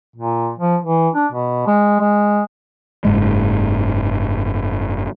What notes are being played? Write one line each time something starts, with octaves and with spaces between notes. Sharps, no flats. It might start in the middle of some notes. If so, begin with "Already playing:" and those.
A#2
F3
E3
D4
B2
G#3
G#3
F#1 G#2 G#3